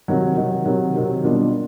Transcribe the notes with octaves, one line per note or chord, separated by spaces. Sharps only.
C3 D#3 F#3
C3 D#3 F#3
C3 D#3 F#3
C3 D#3 F#3
B2 G3 A#3 D4 F4